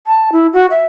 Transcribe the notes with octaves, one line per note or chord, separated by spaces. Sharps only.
A5
E4
F#4
E5